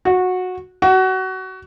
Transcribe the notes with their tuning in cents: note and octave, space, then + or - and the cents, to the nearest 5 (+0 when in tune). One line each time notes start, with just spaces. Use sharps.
F#4 -15
F#4 +25